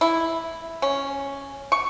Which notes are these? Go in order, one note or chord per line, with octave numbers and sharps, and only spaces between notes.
E4
C#4
C#6